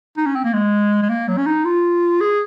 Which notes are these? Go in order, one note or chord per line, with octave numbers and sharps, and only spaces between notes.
D#4
C#4
C4
A#3
G#3
G#3
A#3
F#3
C#4
D#4
F4
G#4